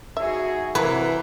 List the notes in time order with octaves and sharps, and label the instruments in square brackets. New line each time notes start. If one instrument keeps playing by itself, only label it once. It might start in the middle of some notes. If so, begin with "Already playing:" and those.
[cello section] D#4 F#4 G#4 [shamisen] E5
[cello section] C3 C5 [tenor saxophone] E3 [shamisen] F#3 A3 A#3 [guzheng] B4